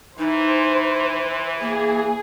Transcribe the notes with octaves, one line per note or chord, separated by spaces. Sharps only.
E3 D#4 C5
A#3 G#4